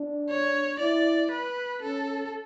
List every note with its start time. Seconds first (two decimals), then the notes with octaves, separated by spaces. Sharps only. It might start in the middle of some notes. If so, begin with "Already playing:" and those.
Already playing: D4
0.30 C#5
0.80 E4 D5
1.31 B4
1.82 C#4 A4